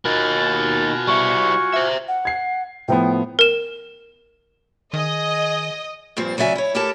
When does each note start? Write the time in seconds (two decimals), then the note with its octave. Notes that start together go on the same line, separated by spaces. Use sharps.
0.05 B2 A#3 D#4 F4 F#4 G#5 A6
1.07 G3 E4 C#6
1.73 C5 E5
2.08 F#5
2.25 G#6 C7
2.88 A2 F3 B3 G5
3.39 A#4 E7
4.93 D#3 G#4 D#5
6.17 G2 A#2 F3 C4
6.37 D2 C#3 F#3 D5 E5 G#5
6.55 E4 C#5
6.75 E4 G4 A4 A#4 A5